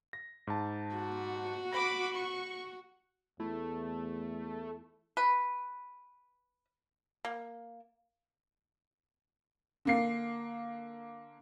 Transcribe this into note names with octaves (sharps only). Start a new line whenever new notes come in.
A#6
G#2 A5
F#4
B5 D6 A#6
C#6
E2 A3 E4
B4
A#3
D3 A#3 C7